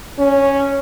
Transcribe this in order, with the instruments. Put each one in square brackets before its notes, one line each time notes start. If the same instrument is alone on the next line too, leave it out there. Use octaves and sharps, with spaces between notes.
[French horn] C#4